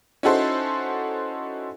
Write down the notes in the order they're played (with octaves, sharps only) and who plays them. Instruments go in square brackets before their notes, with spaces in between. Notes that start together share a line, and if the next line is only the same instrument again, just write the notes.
[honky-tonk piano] C#4 D#4 E4 F#4 A4 C5